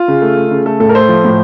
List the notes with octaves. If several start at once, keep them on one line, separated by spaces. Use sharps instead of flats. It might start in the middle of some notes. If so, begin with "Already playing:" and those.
Already playing: F4
C#3
A3
A3
C#3
A3 A4
A2 A4
A#4
A3 C5
F3
A2